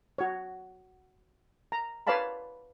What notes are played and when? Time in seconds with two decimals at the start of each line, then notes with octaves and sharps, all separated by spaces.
0.18 F#4 C#5
1.72 A#5
2.07 B4 C#5 D5 F5 A5 B5